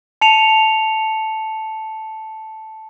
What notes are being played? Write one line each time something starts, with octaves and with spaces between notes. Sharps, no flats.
A5 C#7 F7